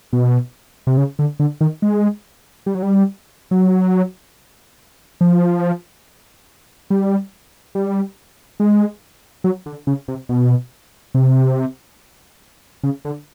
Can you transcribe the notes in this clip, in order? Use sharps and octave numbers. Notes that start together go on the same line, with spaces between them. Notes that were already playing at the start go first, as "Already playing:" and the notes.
B2
C3
C#3
D3
D3
D#3
G#3
G3
F#3
G3
F#3
F3
G3
G3
G#3
F#3
D3
C#3
C3
B2
C3
C#3
D3